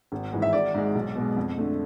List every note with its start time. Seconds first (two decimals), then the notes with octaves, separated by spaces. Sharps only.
0.12 G#1
0.32 G#2 E3 G#3
0.42 E5
0.53 G#1 D5
0.74 G#2 G#3
0.95 B1
1.15 B2
1.20 G#3
1.37 F2
1.58 D3 A3